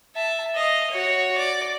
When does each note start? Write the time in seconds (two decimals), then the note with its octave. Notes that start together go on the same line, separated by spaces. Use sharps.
0.15 E5 A5
0.55 D#5 F5
0.91 F#4 C#5
1.38 D5